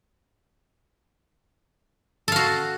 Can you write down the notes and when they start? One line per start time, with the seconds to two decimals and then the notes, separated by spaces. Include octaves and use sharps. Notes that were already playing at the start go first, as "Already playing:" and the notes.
2.28 A4
2.32 F5
2.36 F#4